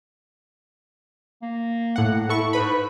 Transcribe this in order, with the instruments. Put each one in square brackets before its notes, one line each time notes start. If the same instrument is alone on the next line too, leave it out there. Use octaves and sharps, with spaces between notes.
[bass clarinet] A#3
[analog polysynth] A2 F#5
[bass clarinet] E4 [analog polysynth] A4 C#6
[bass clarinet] G#2 [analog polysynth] B4 B5